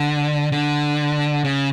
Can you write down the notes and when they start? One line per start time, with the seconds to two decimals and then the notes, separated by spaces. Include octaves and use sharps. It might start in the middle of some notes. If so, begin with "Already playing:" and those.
Already playing: D3
0.52 D3
1.45 C#3